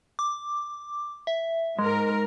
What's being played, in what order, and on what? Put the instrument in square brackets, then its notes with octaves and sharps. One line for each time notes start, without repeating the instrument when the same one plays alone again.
[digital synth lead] D6
E5
[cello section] G#2 A#4 [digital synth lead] G#3